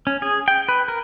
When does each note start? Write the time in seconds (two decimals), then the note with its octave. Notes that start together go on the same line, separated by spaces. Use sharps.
0.07 C#4
0.22 G#4
0.48 G5
0.69 B4
0.88 A#4